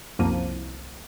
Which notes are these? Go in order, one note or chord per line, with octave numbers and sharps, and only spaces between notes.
C2 F#2 F3 A#3 D#7